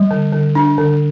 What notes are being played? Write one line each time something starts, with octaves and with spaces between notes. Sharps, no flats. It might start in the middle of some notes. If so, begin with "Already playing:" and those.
Already playing: G3
D3
D3
D4
D3